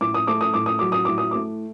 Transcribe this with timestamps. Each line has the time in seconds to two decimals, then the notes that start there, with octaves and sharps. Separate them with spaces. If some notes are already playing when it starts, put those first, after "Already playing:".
0.01 A2 D6
0.14 D#6
0.27 A3 D6
0.41 D#6
0.54 A2 D6
0.66 D#6
0.79 F#3 D6
0.92 D#6
1.05 A2 D6
1.18 D#6
1.31 A3 D6